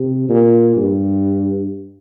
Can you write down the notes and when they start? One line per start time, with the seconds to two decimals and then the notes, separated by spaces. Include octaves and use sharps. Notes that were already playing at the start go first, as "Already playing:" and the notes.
Already playing: C3
0.29 A#2
0.77 G2